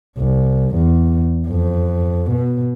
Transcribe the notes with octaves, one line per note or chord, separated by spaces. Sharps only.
C2
E2
F2
B2